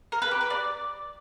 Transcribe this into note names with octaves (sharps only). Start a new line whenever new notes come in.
A#4
B4
G4
B4
D5